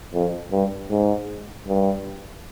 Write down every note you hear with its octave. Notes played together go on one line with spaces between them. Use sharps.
F2
G2
G#2
G2